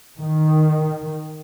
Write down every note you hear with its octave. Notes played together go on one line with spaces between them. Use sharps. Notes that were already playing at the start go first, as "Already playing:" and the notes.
D#3